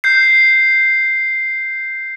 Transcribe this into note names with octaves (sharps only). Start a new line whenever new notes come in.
G6 C7